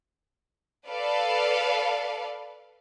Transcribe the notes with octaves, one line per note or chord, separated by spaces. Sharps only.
A4 B4 D5 F5